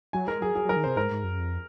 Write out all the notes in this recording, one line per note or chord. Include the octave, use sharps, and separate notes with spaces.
F#3 G#5
G#3 A#4
F#3 G#4
F#3 G#4
F#3 A#4
D#3
C3 C5
G#2 A#4
G#2
F#2
F2